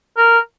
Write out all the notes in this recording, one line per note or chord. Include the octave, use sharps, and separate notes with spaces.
A#4